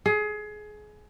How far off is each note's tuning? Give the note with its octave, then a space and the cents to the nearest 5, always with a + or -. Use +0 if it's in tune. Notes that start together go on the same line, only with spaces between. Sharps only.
G#4 +25